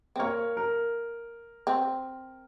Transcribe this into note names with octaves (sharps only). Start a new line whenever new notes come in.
C4
A#3 A#4 C#5
A#4
C4